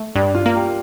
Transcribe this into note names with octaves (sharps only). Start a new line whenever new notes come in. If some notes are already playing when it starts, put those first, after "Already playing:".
Already playing: A3
G2 D4
F4
A#3
G4